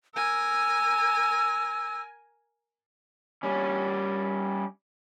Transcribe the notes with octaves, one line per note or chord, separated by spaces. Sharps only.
A#4 G#5 E6
G3 C#4